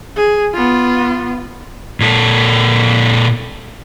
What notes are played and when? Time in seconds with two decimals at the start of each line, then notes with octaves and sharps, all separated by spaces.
0.16 G#4
0.54 B3 F4
2.00 A#2 A4